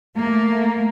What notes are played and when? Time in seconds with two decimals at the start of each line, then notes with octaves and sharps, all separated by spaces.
0.16 A3 A#3